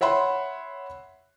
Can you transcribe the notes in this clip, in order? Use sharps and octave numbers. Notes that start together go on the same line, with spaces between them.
C#5 E5 F#5 B5 C6